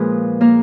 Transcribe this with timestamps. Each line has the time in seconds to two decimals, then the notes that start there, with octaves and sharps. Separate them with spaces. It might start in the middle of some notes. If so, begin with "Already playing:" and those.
Already playing: A#2 F3 G#3 F4 G#4 B4
0.41 A#3 A#4